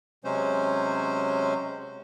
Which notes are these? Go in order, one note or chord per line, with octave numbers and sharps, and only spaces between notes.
C3 F#3 G#3 C#4 C5